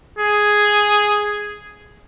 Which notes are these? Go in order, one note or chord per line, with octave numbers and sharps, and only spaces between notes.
G#4